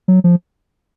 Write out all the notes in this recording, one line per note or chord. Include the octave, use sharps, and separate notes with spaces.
F#3
F3